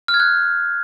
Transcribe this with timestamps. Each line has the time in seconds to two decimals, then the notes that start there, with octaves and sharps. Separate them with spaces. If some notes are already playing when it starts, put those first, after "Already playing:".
0.08 F6
0.14 G#6
0.20 F#6